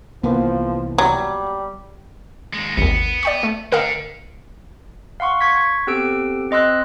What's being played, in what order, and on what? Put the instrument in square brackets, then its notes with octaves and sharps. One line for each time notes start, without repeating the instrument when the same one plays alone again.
[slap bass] C2 E3 [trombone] F3 [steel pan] A#3 B3
[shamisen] F#3 [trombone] G3
[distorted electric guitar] D#2 G#3
[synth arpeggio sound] G#1 D#2 [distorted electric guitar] B3
[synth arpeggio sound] D5 G5 C#6
A3
[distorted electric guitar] D3 [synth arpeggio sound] A#4 D#5 F5
[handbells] F5 F#5 C6 C#6
C#6 G#6 B6
B3 C4 G4 A4 E6 D7
C4 D#5 C6 E6 F#6